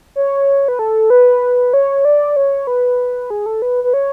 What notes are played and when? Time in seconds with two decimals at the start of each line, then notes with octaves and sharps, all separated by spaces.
0.16 C#5
0.68 B4
0.79 A4
1.10 B4
1.74 C#5
2.05 D5
2.36 C#5
2.67 B4
3.30 G#4
3.46 A4
3.62 B4
3.84 B4
3.94 C#5